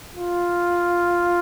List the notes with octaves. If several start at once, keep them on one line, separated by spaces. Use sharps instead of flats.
F4